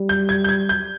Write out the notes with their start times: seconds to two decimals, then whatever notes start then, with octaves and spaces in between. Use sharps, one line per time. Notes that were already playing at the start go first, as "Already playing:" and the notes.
Already playing: G3
0.09 G6
0.29 G#6
0.44 G6
0.49 G#6
0.69 G6